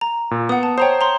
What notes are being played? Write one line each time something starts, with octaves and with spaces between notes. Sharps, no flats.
A#5
A#2
B3 F#5 D#6
A5
C5 C#5 G5 A#5 D#6
A#5 C6